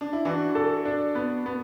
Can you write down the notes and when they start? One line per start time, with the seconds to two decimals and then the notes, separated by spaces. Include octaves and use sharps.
0.01 D4
0.13 E4
0.25 E3 D4 F#4
0.55 A4
0.85 D4
1.15 B3
1.46 B3